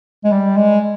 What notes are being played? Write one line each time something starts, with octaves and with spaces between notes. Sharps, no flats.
G#3
G3
G#3